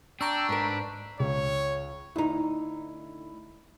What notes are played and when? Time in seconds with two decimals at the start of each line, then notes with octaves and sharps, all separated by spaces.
0.21 D4 G5 A#5 C#6 E6
0.49 G#2 A#4 B4
1.20 C#2 C#5
2.16 D2 D#4 E4